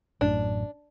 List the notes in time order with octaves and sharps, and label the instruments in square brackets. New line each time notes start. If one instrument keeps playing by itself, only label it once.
[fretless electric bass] A1 F#2 A2 [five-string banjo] D4